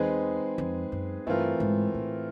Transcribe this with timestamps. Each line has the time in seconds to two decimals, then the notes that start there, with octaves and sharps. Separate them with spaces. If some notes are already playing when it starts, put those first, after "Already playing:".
Already playing: E2 G#3 C4 D#4 G#4 B4
0.58 F2
0.92 F#2
1.27 G2 E3 A3 C4 F4 A#4
1.60 G#2
1.94 A2